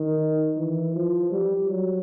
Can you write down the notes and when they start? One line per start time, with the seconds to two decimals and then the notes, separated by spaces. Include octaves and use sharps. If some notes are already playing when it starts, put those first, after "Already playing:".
Already playing: D#3
0.57 E3
0.95 F3
1.32 G3
1.70 F#3